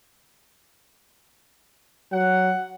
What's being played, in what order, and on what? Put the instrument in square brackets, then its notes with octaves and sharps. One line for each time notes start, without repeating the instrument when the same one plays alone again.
[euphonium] F#3 [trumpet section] F#5